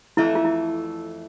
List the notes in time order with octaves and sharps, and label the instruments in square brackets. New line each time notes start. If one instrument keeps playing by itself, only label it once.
[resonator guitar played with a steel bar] F2 E3 A3 [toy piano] E4
[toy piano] F4
E4